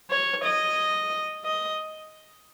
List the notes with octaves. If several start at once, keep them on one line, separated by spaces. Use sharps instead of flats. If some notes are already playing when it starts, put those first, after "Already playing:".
C#5
D#5
D#5